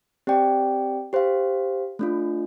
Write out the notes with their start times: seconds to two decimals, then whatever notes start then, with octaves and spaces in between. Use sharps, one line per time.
0.27 C4 G4 D5 G5
1.13 G4 C5 F5
1.99 A3 D4 F4